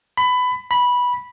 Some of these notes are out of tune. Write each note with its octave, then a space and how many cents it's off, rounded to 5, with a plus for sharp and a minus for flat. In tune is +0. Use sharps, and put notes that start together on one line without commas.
B5 +20
B5 -10